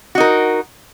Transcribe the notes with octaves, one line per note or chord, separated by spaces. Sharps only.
D#4 F#4 A#4